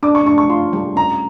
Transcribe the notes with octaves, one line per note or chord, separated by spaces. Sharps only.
D4 D6
C#6
D4 C#6
C#6
F4 C6
G3
C#4 A#5